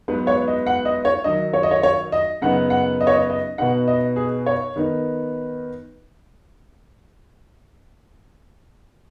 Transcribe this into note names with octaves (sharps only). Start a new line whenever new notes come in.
G#2 F#3 B3 B4
C#5
D#5
F#5
D#5
C#5
D#3 F#3 D#4 D#5
C#5
D#5
C#5
C#5
D#5
F#2 C#3 B3 D#4 F#5
F#5
D#5
C#5
D#5
D#5
B2 B3 D#4 F#5
D#5
G#4
C#5
D#3 B3 D#4